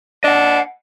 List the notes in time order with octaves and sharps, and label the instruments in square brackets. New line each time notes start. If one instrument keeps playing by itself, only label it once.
[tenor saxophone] D4 [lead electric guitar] D#5 F#5